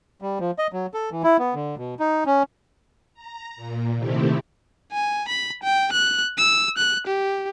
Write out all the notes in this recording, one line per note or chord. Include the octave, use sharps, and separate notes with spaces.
G3
F3
D#5
F#3
A4
E3
E4
B3
D3
B2
D#4
C#4
A#5
A#2
C3 D#3 A3 C4 E4 G4
G#5
B5
G5
F#6
E6
F#6
G4